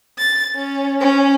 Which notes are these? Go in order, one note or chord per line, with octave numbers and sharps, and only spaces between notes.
A6
C#4
C#4